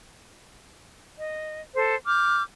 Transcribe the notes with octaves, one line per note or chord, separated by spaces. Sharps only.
D#5
A4 C5
D6 F6 G6